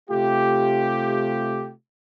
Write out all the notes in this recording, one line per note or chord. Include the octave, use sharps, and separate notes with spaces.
C3 A3 F4 G4